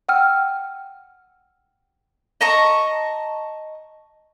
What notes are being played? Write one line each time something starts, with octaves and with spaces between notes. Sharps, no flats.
F#5 G5 E6 F6
D#5 A5 A#5 C#6